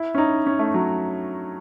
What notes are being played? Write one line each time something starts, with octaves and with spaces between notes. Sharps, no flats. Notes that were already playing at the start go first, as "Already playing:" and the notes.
Already playing: E4
C#4
D#4
C#4
A3
F#3